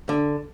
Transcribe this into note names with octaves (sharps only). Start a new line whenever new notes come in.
D3